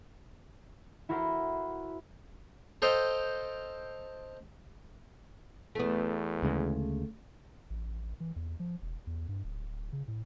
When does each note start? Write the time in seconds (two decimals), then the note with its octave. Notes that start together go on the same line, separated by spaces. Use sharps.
1.09 E4 F#4 A4 A#4 C5
2.82 A4 C5 D#5 F5 G5
5.75 E2 A3 B3
6.42 D2 C#3 G#3
7.70 A1
8.20 E3
8.36 E2
8.60 F3
8.82 E1
9.07 E2
9.28 G2
9.44 D1
9.93 C#3
10.08 A2